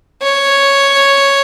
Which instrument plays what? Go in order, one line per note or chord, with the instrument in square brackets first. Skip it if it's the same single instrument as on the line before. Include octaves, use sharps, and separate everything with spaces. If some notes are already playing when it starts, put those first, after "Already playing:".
[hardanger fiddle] C#5